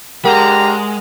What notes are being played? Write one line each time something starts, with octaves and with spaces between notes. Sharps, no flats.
D3 G#3 G4 A#4 F5 F#5 A#5